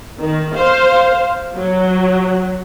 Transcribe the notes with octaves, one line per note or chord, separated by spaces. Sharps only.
D#3
C5 F5
F#3